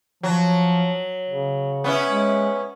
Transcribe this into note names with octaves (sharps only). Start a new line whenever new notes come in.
F3 F#3
C#3
B3 C#4 E4
G#3